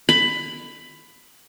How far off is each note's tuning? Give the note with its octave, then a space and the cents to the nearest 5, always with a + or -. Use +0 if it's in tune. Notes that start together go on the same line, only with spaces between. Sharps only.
B5 +15